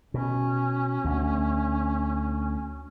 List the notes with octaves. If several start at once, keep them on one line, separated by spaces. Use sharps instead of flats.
B2 C#4
D2